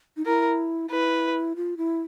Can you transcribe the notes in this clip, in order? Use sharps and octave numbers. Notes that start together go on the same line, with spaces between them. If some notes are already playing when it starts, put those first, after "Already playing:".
D#4
E4 A#4
E4 B4
F4
E4